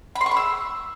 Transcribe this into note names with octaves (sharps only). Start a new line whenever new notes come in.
B5
C6
C#6
B5
E6